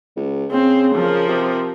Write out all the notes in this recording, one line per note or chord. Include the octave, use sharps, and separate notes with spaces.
C#2
C#3 C4
F3 A#4
C3